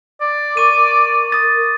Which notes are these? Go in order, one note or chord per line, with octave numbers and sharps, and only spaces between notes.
D5
A#4 C#6 D6 D#7
D#6 A6